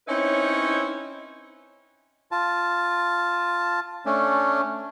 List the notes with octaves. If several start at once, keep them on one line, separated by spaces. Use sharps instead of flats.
C4 C#4 D#4 E4 B4 C#5
F4 A5
A3 C#4 D4